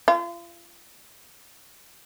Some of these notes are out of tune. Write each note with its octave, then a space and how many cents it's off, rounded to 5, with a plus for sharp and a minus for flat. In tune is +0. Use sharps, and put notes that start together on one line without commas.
F4 -35